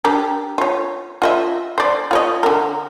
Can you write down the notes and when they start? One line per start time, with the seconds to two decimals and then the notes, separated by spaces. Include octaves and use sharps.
0.04 D4 G4 A#4
0.58 F4 C#5
1.22 F4 D#5 E5
1.78 C5 D5
2.11 F4 C#5 D#5
2.43 D3 A#4